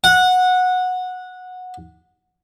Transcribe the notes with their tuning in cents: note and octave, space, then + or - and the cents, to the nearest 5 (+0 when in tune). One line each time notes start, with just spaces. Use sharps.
F#5 -15